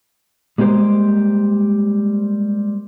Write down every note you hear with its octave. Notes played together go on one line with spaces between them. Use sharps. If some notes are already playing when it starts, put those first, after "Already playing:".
G3 G#3 A#3 G4 C5